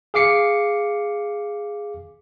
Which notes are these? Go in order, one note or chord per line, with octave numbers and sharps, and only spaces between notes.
G#4 F5 D6 C7 C#7